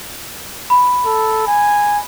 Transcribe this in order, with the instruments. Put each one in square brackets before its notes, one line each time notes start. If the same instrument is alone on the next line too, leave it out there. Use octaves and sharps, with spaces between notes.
[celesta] B5
[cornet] A4
G#5